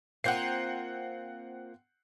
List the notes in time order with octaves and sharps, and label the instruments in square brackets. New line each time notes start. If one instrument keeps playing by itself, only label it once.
[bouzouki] A#3 C4 F4 [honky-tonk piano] F#5 G6 C7